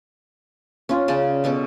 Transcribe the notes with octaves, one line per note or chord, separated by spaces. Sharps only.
C#4 F4
C#3 D5 G#5 A5
B2 C#4 A4 D6